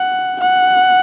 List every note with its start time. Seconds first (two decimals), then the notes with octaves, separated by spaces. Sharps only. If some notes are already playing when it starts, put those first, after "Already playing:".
Already playing: F#5
0.41 F#5